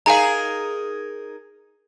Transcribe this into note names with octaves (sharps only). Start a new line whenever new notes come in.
D#4 G#4 A#4 F5 G#5 A#5